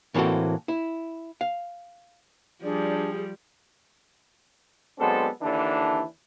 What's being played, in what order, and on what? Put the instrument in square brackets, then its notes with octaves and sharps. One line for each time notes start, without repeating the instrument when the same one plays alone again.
[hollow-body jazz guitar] A2 E3 A#3 C4 F#4 A4
E4
F5
[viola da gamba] F3 G3 [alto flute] D4 [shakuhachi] G#4 [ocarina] D5
[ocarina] G4
[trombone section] F#3 G#3 B3 C4 D4 A4
D#2 D3 E3 D4